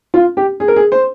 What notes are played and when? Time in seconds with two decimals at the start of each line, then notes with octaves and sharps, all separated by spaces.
0.14 F4
0.37 G4
0.60 G#4
0.68 A#4
0.76 G#4
0.92 C5